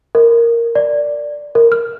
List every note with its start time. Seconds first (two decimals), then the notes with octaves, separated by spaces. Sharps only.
0.15 A#4
0.75 D5
1.55 A#4
1.72 F6